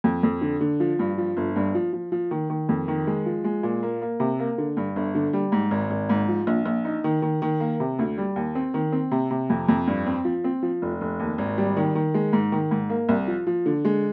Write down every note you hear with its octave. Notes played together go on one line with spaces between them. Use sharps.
F2
F2
D3
D3
F3
G2
F3
G1
G2
F3
F3
F3
D#3
D#3
F2
D#3
G#3
F3
G#3
A#2
A#3
A#3
C3
A#3
D3
G2
G1
D3
G3
G#2
G#1
G#1
G#2
F3
A#1
A#1
D#4
D#3
D#3
D#3
A#3
C3
D2
G3
D#2
C4
D#3
C4
C3
C3
F2
F2
G2
C4
F3
C4
F3
F1
F1
D#2
G#1
G3
D#3
D#3
G#3
G#2
D#3
G#2
A#3
C2
F3
F3
D3
G#3